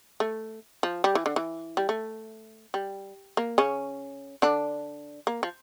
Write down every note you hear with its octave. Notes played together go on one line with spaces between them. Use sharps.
A3
F3
G3
E3
D3
E3
G3
A3
G3
A#3
C#3 C#4
D3 D4
A#3
F3